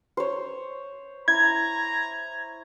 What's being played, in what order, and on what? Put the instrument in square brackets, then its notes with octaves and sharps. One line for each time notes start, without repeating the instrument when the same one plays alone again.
[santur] C5 C#5
[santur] E4 [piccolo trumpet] A#5 [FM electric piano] G#6